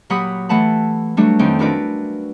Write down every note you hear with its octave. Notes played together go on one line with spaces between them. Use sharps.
A#2 F#3 G4 F#5 B5 D#6
E3 A3 F#5 A5 B5
F#3 G3 A3 D4 F#4
F2 D#3 C#4 G5
D4 E4 F#4 A#4 B4 D5